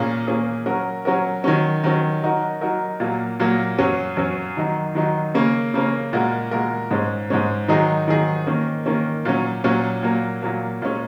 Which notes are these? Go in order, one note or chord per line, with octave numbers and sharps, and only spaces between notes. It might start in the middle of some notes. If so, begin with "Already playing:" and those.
Already playing: A#2 A#3 C#4 G#4
A#2 A#3 C#4 G#4
F#3 C#4 F#4 A#4
F#3 C#4 F#4 A#4
D#3 F#3 C#4
D#3 F#3 C#4
F#3 D#4 F#4 A#4
F#3 D#4 F#4 A#4
A#2 F#3 A#3
A#2 F#3 A#3
F#2 F#3 C#4
F#2 F#3 C#4
D#3 F#3 D#4
D#3 F#3 D#4
C#3 A#3 C#4
C#3 A#3 C#4
A#2 G#3 F#4 A#4
A#2 G#3 F#4 A#4
G#2 G#3 C#4
G#2 G#3 C#4
D#3 F#3 D#4 G#4
D#3 F#3 D#4 G#4
D#3 A#3 C#4
D#3 A#3 C#4
A#2 F#3 C#4
A#2 F#3 C#4
A#2 F#3 A#3
A#2 F#3 A#3
A#2 G#3 C#4